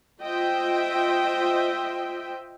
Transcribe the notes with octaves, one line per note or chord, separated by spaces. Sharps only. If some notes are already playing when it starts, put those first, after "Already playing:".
F4 C5 D#5 E5 G5